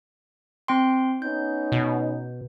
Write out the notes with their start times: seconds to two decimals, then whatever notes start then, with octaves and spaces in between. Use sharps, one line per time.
0.68 C4 G5 C6
1.22 B3 C#4 D#4 G6
1.72 B2